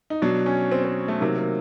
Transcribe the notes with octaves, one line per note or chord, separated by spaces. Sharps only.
D#4
B2 F#3 D4
C#4
C4
C4
A3
C3 D#3 F#3 A#3
A#3